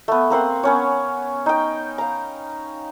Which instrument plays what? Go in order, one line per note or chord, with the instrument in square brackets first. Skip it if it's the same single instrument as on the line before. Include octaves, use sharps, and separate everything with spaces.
[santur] A3 B3
A#3 C4 F#5 C6
B3 C#4 C#5
D#4 G5
F5 A#5